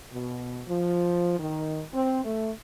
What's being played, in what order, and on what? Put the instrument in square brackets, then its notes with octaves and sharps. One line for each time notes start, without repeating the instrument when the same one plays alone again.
[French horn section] B2
F3
D#3
C4
A3